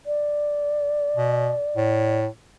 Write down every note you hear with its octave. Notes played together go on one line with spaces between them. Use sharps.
D5
B2
A2